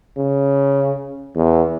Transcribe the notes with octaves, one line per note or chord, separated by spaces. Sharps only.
C#3
E2